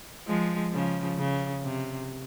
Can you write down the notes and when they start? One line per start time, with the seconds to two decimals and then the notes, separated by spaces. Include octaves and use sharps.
0.27 F3 G#3
0.73 C#3 F3
1.18 C#3
1.64 C3